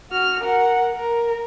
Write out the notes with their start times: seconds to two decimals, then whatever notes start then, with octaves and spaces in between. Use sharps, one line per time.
0.11 F#4 F6
0.42 A#4 F#5
0.95 A#4